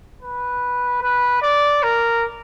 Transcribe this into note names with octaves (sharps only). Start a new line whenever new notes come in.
B4
B4
D5
A#4